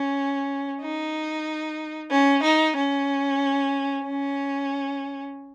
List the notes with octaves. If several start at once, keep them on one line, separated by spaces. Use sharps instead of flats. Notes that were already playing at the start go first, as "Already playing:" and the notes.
Already playing: C#4
D#4
C#4
D#4
C#4
C#4